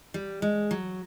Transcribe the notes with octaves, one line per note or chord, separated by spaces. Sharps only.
G3
G#3
F#3